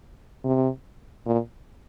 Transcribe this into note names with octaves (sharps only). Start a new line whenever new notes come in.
C3
A#2